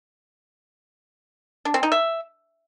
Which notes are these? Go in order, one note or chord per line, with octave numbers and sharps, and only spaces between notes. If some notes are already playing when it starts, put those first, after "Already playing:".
D4
C4
D#4
E5